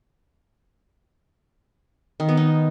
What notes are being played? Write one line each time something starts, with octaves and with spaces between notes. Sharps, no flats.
D#3
B3
D#4